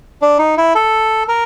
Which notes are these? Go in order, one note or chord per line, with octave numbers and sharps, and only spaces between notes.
D4
D#4
E4
A4
A#4